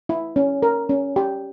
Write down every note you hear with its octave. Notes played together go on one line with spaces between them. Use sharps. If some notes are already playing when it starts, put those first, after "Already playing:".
E4
C#4
A#4
C#4
G4